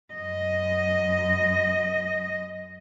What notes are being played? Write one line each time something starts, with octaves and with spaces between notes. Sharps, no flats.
F#2 D#5